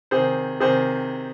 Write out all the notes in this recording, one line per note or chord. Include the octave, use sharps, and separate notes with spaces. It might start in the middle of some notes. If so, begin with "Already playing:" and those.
C3 D#3 G#4 C5
C3 D#3 G#4 C5